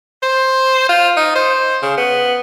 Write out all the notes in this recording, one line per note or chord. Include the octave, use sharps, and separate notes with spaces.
C5
F4
D#4
C5
C#3
B3